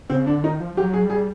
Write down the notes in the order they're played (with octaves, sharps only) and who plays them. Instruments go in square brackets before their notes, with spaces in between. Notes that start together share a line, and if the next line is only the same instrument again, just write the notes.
[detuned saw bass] C#3 [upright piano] C4
[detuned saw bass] D3 [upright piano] D4
[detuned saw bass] D#3 [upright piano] D#4
[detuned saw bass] F3
[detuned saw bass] F3 [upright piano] G4
[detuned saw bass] F#3
[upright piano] G#4
[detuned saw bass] G3
[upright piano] G#4